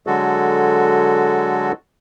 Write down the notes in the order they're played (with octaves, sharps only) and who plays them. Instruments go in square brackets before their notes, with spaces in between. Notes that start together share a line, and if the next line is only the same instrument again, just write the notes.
[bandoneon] D3 F#3 G#3 F#4 A4